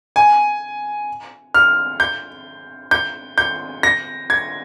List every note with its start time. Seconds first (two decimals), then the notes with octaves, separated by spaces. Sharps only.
0.16 G#5
1.54 F6
2.00 G6
2.91 G6
3.38 G6
3.83 A#6
4.30 G#6